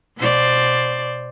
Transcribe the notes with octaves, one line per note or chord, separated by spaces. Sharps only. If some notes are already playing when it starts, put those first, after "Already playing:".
B2 C5 D5